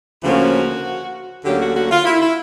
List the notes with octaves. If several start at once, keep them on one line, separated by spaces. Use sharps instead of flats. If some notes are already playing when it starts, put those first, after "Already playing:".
D2 C#3 F3 A#3 C#4 F#4
D2 D3 F#3 A#3 C#4 G4
F#4
F#4
F4
E4
E4